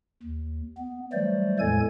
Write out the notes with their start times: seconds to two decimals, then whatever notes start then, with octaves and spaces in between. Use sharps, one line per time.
0.23 D#2
0.78 B3
1.13 E3 F#3 G3 A3 C5 D5
1.59 E2 A2 G#3 A4 G#5 G#6